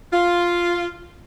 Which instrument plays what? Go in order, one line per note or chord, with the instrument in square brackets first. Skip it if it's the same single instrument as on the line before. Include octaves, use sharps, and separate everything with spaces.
[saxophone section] F4